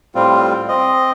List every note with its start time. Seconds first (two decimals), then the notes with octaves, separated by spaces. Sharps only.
0.15 A2 G3 C4 F4
0.68 C4 D#5